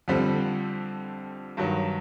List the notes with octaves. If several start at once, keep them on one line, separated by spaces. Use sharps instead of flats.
F2 D3 G3 C4
G2 D#3 F#3